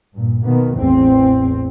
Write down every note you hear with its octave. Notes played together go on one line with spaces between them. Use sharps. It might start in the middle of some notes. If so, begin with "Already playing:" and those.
G2 A#2
B2 D#3 A#3 B3
A1 E2 E3 C4